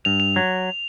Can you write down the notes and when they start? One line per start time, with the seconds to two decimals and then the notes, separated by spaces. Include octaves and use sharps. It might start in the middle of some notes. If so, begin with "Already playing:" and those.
0.05 G2 F7
0.20 F7
0.36 F#3